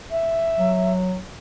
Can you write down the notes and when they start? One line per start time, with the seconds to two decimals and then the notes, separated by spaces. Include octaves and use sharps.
0.11 E5
0.59 F#3